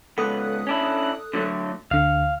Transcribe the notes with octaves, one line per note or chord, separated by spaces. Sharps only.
C#2 B3 A4 D#6 F#6
C#4 D4 E4
D3 F#3 A3
D2 D3 F5